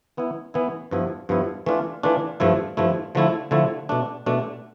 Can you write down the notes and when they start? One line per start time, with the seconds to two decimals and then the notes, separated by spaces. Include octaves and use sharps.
0.17 E3 B3 E4
0.54 E3 B3 E4
0.91 G2 F3 B3 E4
1.29 G2 F3 B3 E4
1.66 E3 A3 D4 F4
2.03 E3 A3 D4 F4
2.40 G2 F3 A3 E4
2.77 G2 F3 A3 E4
3.15 D3 F3 A3 E4
3.51 D3 F3 A3 E4
3.89 B2 A3 D4
4.26 B2 A3 D4